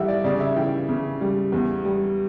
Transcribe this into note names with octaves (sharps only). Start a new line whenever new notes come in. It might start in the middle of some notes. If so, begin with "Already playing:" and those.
Already playing: E3 G3 E5 F#5
D5
C#3 D5
E5
E3 G5
C#3
G3
E2
G3